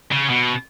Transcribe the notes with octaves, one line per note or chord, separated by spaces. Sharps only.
C#3
B2